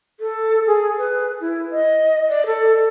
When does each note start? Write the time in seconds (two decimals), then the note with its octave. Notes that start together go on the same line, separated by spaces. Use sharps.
0.20 A4
0.67 G#4
0.98 B4
1.41 E4
1.71 D#5
2.30 D5
2.46 A4